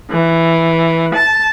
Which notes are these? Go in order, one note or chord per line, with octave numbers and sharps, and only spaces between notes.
E3
A5